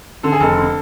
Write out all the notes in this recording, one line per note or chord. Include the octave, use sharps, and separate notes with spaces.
D3 A4
G#4
F1 A4
D3